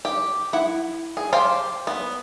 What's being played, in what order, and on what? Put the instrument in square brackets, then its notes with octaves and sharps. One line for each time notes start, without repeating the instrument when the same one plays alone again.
[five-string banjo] G4
E4 F#5
G#4
G4 C5 F5
B3